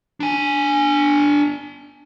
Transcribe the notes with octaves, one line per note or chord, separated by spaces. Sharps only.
D4 G#5